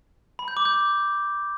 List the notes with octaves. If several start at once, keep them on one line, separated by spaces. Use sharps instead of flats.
B5
G6
D6
G6